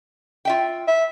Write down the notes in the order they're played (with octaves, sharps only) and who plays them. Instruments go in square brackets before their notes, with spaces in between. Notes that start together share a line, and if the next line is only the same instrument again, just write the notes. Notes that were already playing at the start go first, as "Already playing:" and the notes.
[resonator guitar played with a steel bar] F4 E5 G5
[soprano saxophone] E5